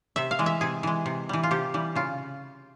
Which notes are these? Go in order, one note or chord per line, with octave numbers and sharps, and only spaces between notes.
C3 E5
F5
E3 G#3
E5
C3 G#4
E3 G#3
C3
E3 G3
F4
C3 G4
E3 G3
C#3 F4